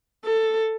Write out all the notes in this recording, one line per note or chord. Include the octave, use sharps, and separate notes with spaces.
A4